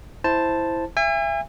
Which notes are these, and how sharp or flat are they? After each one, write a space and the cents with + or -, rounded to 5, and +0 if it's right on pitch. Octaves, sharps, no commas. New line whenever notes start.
E4 +0 C5 +0 A5 +0
E5 +30 G#5 -40